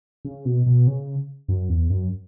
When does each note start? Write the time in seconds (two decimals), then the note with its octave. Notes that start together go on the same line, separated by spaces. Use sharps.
0.25 C#3
0.45 B2
0.66 B2
0.87 C#3
1.48 F#2
1.69 E2
1.90 F#2